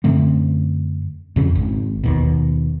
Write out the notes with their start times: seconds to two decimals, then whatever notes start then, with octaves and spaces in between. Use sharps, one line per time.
0.04 F#2 D3 A3 C4
1.36 F2 C#3 C#4
1.55 G#1
2.04 D#2 B2